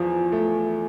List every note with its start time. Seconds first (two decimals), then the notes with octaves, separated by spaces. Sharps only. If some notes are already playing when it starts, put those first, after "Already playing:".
Already playing: E2 F3
0.32 A3